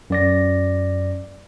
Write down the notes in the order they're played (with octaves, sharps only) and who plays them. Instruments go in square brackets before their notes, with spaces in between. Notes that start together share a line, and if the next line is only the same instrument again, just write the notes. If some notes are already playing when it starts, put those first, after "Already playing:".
[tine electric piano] F#2 D5 A#6